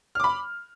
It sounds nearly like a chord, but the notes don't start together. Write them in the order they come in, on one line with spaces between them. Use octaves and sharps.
F6 D6 B5